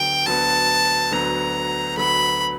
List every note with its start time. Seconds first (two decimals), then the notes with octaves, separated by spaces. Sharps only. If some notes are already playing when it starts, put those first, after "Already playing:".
Already playing: D2 D3 F#3 B3 G5
0.26 D2 D3 F#3 B3 A5
1.11 D2 D3 F#3 B3 A#5
1.97 D2 D3 F#3 B3 B5